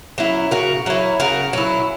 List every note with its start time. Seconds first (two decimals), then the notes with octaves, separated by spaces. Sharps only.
0.18 F#3 C#4 E4
0.51 C#3 F#4 A#4
0.86 F#3 C#4 E4
1.20 C#3 F#4 A#4
1.53 F#3 C#4 E4